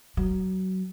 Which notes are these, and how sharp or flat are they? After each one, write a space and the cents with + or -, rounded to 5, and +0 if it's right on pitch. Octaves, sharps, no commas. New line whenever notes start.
F#3 +20